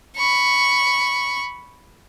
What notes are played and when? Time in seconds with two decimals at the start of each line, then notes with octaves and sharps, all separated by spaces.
0.16 B5 C#6